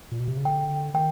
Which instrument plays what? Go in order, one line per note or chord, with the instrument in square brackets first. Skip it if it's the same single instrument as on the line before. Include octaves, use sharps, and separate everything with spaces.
[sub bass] A#2
B2
C3
C#3
[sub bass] D3 [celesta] G5
[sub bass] D#3 [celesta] G5